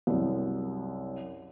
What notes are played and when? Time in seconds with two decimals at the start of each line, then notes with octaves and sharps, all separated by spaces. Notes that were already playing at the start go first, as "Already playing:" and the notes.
0.07 C2 F#2